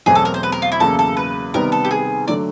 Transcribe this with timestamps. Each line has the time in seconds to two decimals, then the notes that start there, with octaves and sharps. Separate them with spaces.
0.06 E2 B2 F#3 A3 C4 G#4
0.15 A4
0.25 A#4
0.34 C5
0.43 B4
0.52 A#4
0.62 F4
0.72 E4
0.80 E2 C#3 F#3 A#3 A4
0.99 A4
1.17 B4
1.54 C3 D#3 G3 B3 A#4
1.72 A4
1.85 G4
1.91 G#4
2.28 D3 F#3 A3 D5